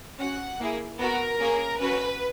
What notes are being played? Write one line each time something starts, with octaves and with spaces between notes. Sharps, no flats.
C#4 F#4 F#5
A#3 E4 G#4
B3 F#4 A#4
A#3 C#4 G#4
C#4 F#4 B4